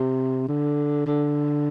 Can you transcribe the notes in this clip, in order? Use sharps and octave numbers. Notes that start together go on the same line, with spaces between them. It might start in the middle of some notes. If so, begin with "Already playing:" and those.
Already playing: C3
D3
D3